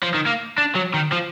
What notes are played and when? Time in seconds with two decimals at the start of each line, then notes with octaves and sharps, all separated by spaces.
0.03 F3
0.14 D#3
0.26 A#3
0.58 D4
0.75 F#3
0.94 D#3
1.12 F3